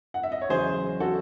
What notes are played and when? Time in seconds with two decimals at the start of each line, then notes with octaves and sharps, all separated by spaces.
0.14 F#5
0.23 E5
0.32 D#5
0.42 C#5
0.49 E2 C#3 F#3 G#4 C5
1.00 F#4 A4